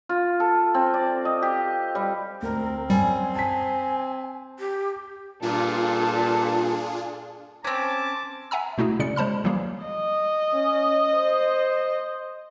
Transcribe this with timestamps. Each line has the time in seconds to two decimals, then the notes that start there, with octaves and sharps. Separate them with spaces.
0.09 F4
0.40 A4
0.74 C4
0.94 D5
1.25 D#5
1.42 G4
1.95 G3
2.42 D2 C4 A#4
2.90 F#2 G3 G#5
3.35 G#5 A5 B6
4.59 G4
5.42 G2 A#2 D4 F4 G#4 A4
7.65 C4 C#4 A5 D6
8.51 E5 F#5 G#5 A#5 E6
8.78 B2 A3 E4 F#4 G#4
8.99 C#3 G#3 C#4 D5 C#7
9.16 G#3 C5 A5 B5 F6
9.44 E3 F#3 G3 A#3 G#4
9.84 D#5
10.53 C#4
11.13 C5